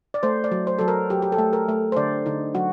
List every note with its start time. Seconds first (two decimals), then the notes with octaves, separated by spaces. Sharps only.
0.14 D5
0.23 A3 C5
0.44 D5
0.52 F#3
0.67 C5
0.79 F#3 A4
0.88 A#4
1.10 F#3 G4
1.22 G4
1.32 A4
1.38 A3
1.53 A#4
1.69 A3
1.92 C5
1.97 D3 D5
2.26 D3 D#4
2.55 F#3 F#4